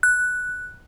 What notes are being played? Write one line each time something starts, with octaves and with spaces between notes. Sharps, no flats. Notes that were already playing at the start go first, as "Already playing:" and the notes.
F#6